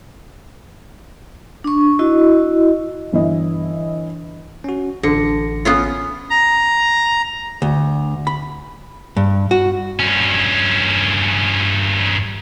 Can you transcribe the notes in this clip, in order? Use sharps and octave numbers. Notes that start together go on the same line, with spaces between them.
D4 C#6
E4 F#4 D#5
G1 E3 E4 D#5
C#4 F#4
A1 D3 A#6 C#7
B3 C#4 F4
A#5
D2
B5
G2
F#4
G2 C#4